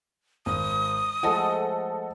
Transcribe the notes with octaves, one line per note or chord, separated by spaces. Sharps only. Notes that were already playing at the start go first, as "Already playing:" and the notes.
G#1 D#6
F3 G#3 A3 A4 D#5 F#5